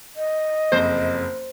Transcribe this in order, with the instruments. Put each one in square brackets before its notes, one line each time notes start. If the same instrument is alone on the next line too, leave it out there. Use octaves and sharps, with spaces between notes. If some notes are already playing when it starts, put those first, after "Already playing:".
[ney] D#5
[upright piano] F#1 F2 [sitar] C5